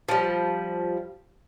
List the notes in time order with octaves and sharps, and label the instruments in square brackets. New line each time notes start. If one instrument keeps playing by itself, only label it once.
[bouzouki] F3 G3